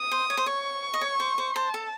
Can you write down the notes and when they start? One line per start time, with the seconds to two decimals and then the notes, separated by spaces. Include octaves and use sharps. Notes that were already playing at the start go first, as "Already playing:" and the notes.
Already playing: D#6
0.11 C5
0.30 C#5
0.37 C5
0.46 C#5 C#6
0.94 D#5
1.01 C#5
1.20 C5
1.38 C5
1.56 C5 A5
1.74 A4